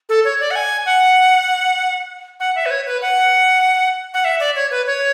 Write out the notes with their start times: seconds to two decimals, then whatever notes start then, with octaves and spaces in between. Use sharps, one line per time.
0.09 A4
0.25 C#5
0.40 D5
0.51 F#5
0.56 G#5
0.86 F#5
2.40 F#5
2.56 E5
2.66 B4
2.71 C#5
2.87 B4
3.02 F#5
4.14 F#5
4.25 E5
4.40 D5
4.56 C#5
4.71 B4
4.86 C#5